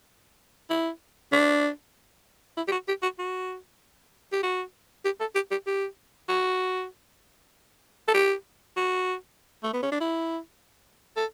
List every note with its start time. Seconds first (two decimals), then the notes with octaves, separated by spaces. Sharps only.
0.70 E4
1.32 D4
2.57 E4
2.68 G4
2.72 F#4
2.88 G4
3.03 F#4
3.19 F#4
4.32 G4
4.43 F#4
5.05 G4
5.20 A4
5.35 G4
5.51 G4
5.67 G4
6.29 F#4
8.08 A4
8.14 G4
8.77 F#4
9.64 A3
9.74 B3
9.83 C#4
9.92 D4
10.01 E4
11.17 A4